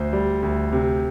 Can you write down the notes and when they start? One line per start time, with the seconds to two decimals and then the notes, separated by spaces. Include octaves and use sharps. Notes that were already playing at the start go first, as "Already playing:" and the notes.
Already playing: D2 C5
0.13 G3
0.43 D2
0.72 C3